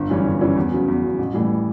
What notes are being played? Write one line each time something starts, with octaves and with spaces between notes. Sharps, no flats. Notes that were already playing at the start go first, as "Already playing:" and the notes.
Already playing: G1
F#2 E3 G3 C#4
G1
F#2 E3 G3 C#4
E2
C#3 F#3
E2
C#3 F#3
A1
A2 E3 G3